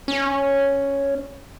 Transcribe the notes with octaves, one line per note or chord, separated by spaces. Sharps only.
C#4